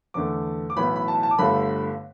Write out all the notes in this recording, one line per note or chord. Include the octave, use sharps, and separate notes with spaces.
E2 D3 A3 D6
D6
B1 A2 E3 B3 B5
B5
A5
A5
D6
G1 G2 D3 A3 B5